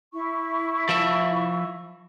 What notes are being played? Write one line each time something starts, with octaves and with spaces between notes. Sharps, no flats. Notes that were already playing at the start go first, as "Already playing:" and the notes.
E4 C#6
F3 E5